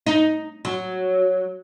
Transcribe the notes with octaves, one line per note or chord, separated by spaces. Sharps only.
D#4
F#3